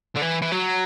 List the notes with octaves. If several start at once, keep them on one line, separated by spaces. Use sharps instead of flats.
D3
E3
E3
F#3